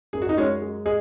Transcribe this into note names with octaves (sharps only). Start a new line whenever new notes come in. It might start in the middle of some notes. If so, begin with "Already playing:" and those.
F#2 G#4
F#4
D#4
G#3 C#4 F#4
G#3
G#4 D#5